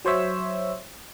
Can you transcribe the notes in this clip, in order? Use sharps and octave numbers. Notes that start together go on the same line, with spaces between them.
F#3 C5 C#5 E5 E6